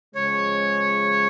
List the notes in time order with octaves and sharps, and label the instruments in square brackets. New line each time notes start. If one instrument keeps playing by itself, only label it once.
[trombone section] C#3 F3 G#3 [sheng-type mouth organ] C#5